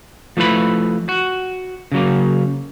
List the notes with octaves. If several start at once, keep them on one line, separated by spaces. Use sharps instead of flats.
F3 A3 E4 B4 B5
F#4
C#3 F#3 A#3